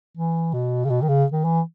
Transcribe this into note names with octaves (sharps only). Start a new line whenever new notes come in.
E3
B2
C#3
B2
D#3
C#3
D#3
E3